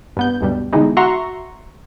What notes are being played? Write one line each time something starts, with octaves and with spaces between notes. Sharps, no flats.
G2 B3 G6
D2 G2 B2 G3
B2 D3 E3 G#3 D#4 E4
F#4 E5 F#5 A#5 C6 C#6